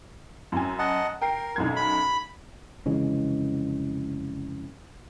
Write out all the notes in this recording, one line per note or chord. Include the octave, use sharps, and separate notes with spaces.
F#2 G#5
D#5 F#5 A5
A#4 G5 C7
B1 F#2 G#6
B5
F1 C#3 E3 G#3